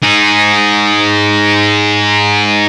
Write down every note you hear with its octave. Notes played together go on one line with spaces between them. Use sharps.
D#4 G#4